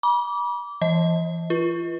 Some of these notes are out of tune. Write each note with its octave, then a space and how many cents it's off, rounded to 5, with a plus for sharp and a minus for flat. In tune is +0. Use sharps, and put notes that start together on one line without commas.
B5 -40 D6 -20
E3 +30 D#5 +30
F4 -30 B4 -25